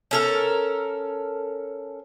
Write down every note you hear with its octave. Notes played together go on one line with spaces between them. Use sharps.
C#4 A4 A#4